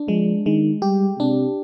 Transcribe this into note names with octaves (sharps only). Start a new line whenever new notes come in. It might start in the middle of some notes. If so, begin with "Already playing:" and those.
Already playing: D4
F3 G#3
D#3 G#3
G3 G4
C3 D4